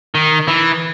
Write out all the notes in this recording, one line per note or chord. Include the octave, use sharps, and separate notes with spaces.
D#3
E3